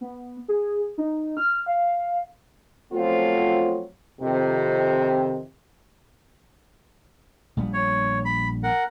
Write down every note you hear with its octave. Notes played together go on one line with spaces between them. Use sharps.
B3
G#4
D#4
F6
F5
F3 F#3 A3 B3 C4 F4
F2 C3 D#3
A#1 G3 B3
C#5
B5
A#4 F#5